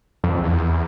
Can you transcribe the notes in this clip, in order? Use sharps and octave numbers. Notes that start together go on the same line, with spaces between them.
F2
E2